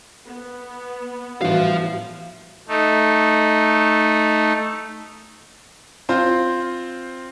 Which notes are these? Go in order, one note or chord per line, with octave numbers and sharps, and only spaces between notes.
B3
A2 E3 F3 G3 F#4 F5
A3 D#4
C4 F4 C5